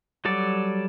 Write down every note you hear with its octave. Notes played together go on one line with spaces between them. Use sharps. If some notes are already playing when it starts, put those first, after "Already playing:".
F#3 G3 A4 D5